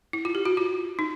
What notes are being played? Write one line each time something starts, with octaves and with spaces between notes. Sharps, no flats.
E4
F4
G4
F#4
F4
D#4